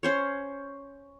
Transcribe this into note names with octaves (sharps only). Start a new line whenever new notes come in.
C#4 C5 C#5